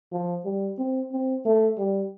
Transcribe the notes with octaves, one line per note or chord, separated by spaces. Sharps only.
F3
G3
C4
C4
A3
G3